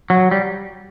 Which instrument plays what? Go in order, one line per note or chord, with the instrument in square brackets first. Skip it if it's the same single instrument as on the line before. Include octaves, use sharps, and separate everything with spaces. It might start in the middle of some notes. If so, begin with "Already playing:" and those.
[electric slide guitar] F#3
G3